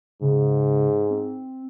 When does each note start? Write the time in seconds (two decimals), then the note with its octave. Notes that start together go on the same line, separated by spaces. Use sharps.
0.21 G#2 C#3
1.10 C4